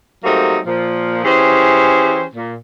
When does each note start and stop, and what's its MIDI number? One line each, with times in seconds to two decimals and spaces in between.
0.24 0.58 54
0.24 0.58 55
0.24 0.58 57
0.24 0.58 58
0.24 0.58 60
0.24 0.58 63
0.67 1.22 46
0.67 1.22 53
1.23 2.23 52
1.23 2.23 61
1.23 2.23 67
1.23 2.23 68
1.23 2.23 72
2.35 2.53 46